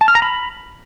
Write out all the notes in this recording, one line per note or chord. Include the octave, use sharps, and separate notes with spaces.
A5
F6
A#5
B5